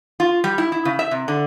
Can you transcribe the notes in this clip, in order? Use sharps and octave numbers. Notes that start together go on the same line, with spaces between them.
F4
G3
E4
E4
C#3
E5
C3
D3